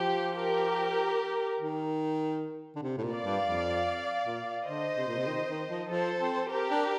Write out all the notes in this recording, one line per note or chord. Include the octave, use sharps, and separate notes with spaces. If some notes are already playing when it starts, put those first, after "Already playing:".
Already playing: F3 G4
G4 A#4
D#3
D3
C3
A2
A#2
D5 F5
G2
F2
A#2
D3 C5 D#5
C3
A#2
C3
D#3
D#3
F3
F3 A4 C5
C4
G4 A#4
D4